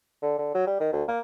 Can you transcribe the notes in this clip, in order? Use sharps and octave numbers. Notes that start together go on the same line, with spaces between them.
D3
D3
F#3
G3
D#3
D2
A#3